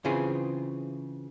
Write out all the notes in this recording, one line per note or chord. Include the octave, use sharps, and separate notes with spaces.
C#3 E3 C4 F4 G#4